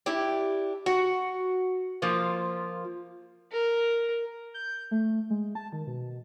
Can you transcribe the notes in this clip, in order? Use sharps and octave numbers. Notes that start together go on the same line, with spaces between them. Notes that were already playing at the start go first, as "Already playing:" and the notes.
D4 E4 G4
F#4
F3 A#3 F4
A#4
G6
A3
G#3
A5
D#3
B2